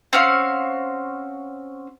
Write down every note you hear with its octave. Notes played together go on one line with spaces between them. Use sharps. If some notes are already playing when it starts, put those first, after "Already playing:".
C4 C#4 F#4 F5